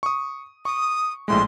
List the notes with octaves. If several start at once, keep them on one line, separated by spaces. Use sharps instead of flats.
C#6 D#6
C#6 D#6
A#1 A2 G#3 C6